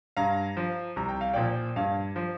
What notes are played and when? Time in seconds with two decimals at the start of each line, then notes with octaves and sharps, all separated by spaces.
0.17 G2 F5 A#5
0.57 F3
0.96 C2 A#5
1.09 G5
1.21 F5
1.33 A#2 F3 D5 G5
1.76 G2 F5
2.16 F3